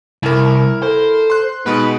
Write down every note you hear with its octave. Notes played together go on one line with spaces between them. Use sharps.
C2 E4 A#4
A4 C5
C6 F#6
B2 G#3 B3 D#4 B4